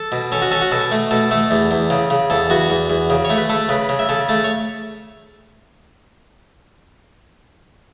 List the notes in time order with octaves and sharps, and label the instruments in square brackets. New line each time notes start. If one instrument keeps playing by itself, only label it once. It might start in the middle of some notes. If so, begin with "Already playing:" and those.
Already playing: [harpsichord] A4
B2
C#4 A4
F#4
C#4 A4
F#4
B2 A4
A3
B2 A4
A3 A4
E2
E2
C#3
C#3
E2 A4
E2 F#4
E2
E2
C#3
C#5
A3
B4
A3 A4
C#3 B4
C#3
E5
C#3 A4
A3 A4
C#5